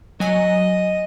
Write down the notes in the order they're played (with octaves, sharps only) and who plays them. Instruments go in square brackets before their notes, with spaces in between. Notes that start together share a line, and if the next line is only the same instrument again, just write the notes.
[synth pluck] F#3 G#5 [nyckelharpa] D#5